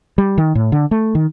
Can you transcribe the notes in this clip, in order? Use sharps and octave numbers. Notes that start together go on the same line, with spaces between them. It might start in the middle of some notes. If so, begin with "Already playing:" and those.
G3
D#3
A2
D3
A3
D#3